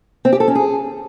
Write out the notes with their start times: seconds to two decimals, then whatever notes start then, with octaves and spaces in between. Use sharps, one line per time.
0.25 C4
0.33 G4
0.40 A4
0.48 C#4
0.55 G#4